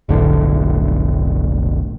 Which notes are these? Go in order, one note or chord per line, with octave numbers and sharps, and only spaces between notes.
F1 B1 A2 D3